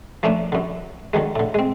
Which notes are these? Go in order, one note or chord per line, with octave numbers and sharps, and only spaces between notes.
F3 A3 A#3 C#4 D4
F#2 D3
D3 D#3 F#3 G#3
A2 D3
G#3 C4